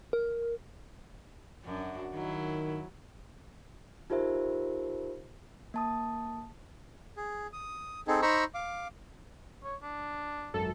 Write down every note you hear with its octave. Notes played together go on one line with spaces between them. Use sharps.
A#4
F#2 D4 F#4
D#3 F#3 E4
D#4 F4 G4 A#4 C5 E5
A#3 A5 D#6
G#4
D#6
C4 D#4 G#4 A4
D#4 C5 A#5 B5 C#6 E6
F5 D6
C#5
D4
G#1 F#2 A4